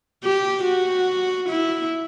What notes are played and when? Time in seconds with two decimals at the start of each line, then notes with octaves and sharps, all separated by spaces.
0.24 G4
0.64 F#4
1.49 E4